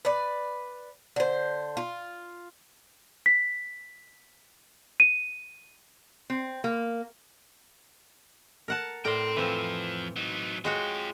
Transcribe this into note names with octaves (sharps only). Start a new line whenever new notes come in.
B4 D5
D3 C5
F4
B6
D#7
C4
A#3
A#4 F#5 A5
A2 A#4 D5 G5 C6
F2 E3 F3 C4
F#3 D#4
G#3 F4 F#4 C#5 G5